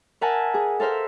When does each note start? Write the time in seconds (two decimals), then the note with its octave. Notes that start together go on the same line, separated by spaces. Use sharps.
0.21 A#4 E5 F#5 G#5 A5
0.54 G#4
0.80 A4 A#4 C5 E5 F5